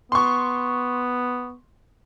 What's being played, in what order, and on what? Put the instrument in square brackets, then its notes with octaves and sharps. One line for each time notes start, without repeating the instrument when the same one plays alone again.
[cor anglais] B3 [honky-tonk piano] C6 C#6